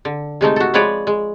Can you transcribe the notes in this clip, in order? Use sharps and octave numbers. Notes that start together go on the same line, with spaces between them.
D3
C3 G#3 A3 D#4
F#4 A4
F3 G#3 B4 C#5 D5
G#3